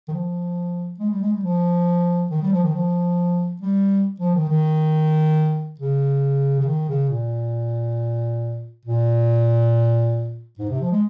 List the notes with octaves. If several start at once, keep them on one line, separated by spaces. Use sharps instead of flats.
D#3
F3
G#3
G3
G#3
G3
F3
D#3
G3
F3
D#3
F3
G3
F3
D#3
D#3
C#3
C#3
D#3
C#3
A#2
A#2
G#2
C3
F3
G#3